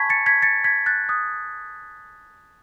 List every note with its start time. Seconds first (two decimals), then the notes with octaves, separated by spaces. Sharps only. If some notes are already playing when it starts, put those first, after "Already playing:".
Already playing: G#5 A5 B5 C#6 G#6 B6
0.10 A6 C#7
0.26 G#6 B6
0.42 A6 C#7
0.64 G#6 B6
0.86 F#6 A6
1.09 D#6 F#6